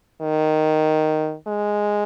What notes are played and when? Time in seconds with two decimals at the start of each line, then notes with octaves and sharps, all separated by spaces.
0.21 D#3
1.47 G#3